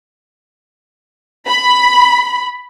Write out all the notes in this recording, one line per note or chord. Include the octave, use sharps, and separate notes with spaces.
B5